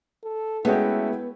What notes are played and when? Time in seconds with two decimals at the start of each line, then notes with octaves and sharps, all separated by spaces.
0.24 A4
0.65 G#3 A3 B3 C#4 E4 F#4 G5